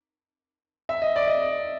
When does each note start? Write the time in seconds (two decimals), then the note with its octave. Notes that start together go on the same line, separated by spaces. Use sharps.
0.89 E5
1.02 D#5
1.16 D5
1.28 D#5